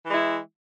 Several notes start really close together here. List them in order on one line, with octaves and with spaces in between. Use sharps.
E3 G#3 E4